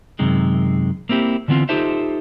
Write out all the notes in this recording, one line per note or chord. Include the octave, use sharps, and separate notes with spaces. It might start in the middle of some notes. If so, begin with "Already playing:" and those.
F#2 C3 D#3 G#3
A#3 C4 E4 G4
D3 E3 B3 C4 F4
D#4 F4 G4 A4 C5 E5